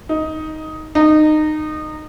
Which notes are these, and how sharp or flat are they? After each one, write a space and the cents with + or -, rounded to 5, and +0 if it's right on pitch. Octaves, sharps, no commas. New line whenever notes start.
D#4 +10
D#4 -20